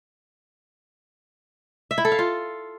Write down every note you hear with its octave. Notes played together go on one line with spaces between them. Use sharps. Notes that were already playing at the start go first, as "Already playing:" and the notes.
E5
E4
A4
F5
F4